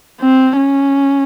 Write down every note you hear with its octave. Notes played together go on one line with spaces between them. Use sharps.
C4
C#4